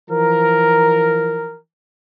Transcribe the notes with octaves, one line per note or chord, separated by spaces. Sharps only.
E3 F3 A#4